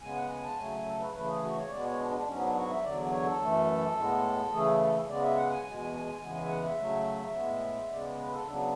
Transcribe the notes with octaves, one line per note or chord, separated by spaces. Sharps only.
C#3 G#3 B3 G#5
F#5
G#5
A5
C#3 F#3 A3 G#5
G#5
A4
B4
C#3 E3 A3 B4
G#4
F#4
C#5
B2 G#3 B3 D5
C#5
D4
D4
G#2 F#3 B3 C#4
D4
F#4
E5
E2 D3 F#3 D5
C#5
A4
F#2 E3 A3
A2 G#3 B3
C#3 E3 A3 G#4
A4
A4
C#3 G#3 B3 D5
E5
F#5
G#5
E2 B2 G#3 G#5
G#5
G#5
G#5
E2 C#3 E3 G#3 B3 G#5
G#5
E5
F#5
E5
C#3 F#3 A3
A2 G#3 B3
C#3 G#3 B3 D5
B4
A4
C#3 F#3 B3 D4